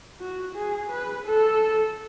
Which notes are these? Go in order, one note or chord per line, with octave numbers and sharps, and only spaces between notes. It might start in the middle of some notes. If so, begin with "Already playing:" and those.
F#4
G#4
B4
A4